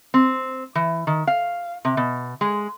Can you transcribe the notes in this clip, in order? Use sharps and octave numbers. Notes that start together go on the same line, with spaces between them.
C4
E3
D#3
F5
C3
B2
G#3